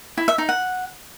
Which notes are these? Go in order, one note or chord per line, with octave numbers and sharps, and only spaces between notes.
E4
E5
D#4
F#5